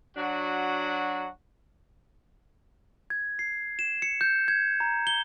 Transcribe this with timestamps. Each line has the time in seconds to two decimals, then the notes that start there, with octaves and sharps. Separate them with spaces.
0.17 F#3 D4 F#4
3.10 G#6
3.39 C7
3.79 E7
4.02 C#7
4.21 G6
4.48 G#6
4.80 A#5
5.07 G7